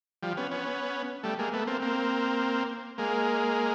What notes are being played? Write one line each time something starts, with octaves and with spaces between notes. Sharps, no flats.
F3 G3
B3 C#4
B3 C#4
G3 A3
G#3 A#3
A3 B3
A#3 C4
A#3 C4
G#3 A#3